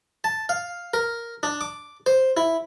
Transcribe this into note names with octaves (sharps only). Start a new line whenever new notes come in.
A5
F5
A#4
D4
D6
C5
E4